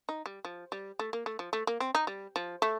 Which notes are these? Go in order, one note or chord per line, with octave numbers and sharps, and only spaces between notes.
D#4
G3
F3
G3
A3
A#3
A3
F3
A3
A#3
C4
D#4
G3
F3
A3